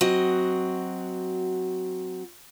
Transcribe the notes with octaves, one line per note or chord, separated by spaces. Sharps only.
F#3 C4 F#4 D#5